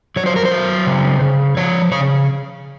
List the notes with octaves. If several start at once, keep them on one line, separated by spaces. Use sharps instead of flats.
F#3 C#5
C5
A#4
C5
F#3
C#3
C#3
F3 C#5
C#3 C#5